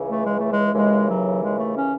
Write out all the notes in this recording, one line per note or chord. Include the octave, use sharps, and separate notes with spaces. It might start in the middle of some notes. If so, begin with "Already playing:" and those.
Already playing: C#2 C#3 E3
A3
G#3
A3
G#3
D#2 C#3 E3 G#3
F#3
G#3
A3
C#4